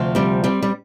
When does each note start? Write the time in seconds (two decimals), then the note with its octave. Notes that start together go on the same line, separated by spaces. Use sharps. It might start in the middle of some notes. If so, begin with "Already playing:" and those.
Already playing: D2 C3 F3
0.15 G3 C4
0.44 G3 C4
0.63 G3